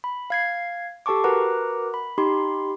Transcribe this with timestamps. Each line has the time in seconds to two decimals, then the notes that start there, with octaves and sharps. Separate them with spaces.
0.04 B5
0.30 F5 G#6 C7
1.06 G4 A4 A5 C#6 D6
1.24 F#4 A#4 B4 F#5 A#5 D6
1.94 B5
2.18 D#4 G4 B5 C6